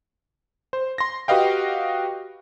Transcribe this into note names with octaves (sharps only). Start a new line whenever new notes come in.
C5
C6 A#6
F#4 G4 B4 D#5 F5 G5